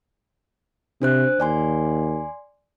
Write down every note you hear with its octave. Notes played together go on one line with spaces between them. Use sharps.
C3 D4 C5 F#6
D#2 D5 G#5 C6